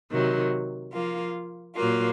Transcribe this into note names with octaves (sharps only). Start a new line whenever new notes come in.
C3 D#3 F#3
F3 A#3 F4
A#2 F#3 A#3 F4